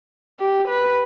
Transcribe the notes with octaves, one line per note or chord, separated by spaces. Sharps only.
G4
B4